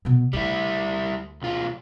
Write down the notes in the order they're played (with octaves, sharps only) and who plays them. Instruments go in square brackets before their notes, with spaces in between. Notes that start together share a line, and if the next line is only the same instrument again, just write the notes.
[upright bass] B2 B3
[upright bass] D2 [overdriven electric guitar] G3 E4
[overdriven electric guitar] B1 F4